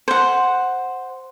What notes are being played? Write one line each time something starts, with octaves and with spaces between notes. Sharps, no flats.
C5 F#5